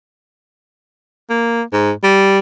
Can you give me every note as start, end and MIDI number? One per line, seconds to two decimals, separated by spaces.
1.30 1.62 58
1.73 1.92 44
2.03 2.39 55